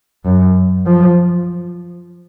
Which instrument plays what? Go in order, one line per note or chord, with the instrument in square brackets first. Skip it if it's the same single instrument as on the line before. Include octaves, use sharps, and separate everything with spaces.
[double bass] F#2
F3